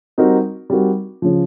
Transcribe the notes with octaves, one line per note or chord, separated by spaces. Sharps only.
G3 C4 D#4 F#4 A#4
G3 C4 D#4 F#4 A#4
C#3 F3